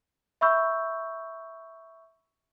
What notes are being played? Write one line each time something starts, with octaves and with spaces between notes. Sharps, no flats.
E5 B5 C#6 E6 G6